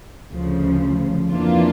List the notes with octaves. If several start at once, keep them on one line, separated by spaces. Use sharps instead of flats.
D2 C#3 F3
F2 E3 A#3 D4 F4